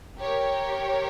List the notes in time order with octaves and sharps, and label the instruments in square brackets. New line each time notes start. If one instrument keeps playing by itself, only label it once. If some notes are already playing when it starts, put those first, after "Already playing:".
[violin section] G4 A#4 C#5